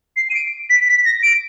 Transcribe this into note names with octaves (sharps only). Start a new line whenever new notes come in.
C7
D#7
D7
B6
B6
A#6
D7